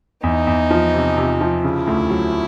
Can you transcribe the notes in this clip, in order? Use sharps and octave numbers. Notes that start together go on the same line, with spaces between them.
E2 D#4
E2
F3
C3
C3
F3
C#3 E4
D2
F#3